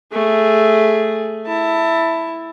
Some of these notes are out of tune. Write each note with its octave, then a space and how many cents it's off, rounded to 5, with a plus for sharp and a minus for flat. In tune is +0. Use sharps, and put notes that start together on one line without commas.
A3 +0 G#4 +0
E4 +0 A5 +20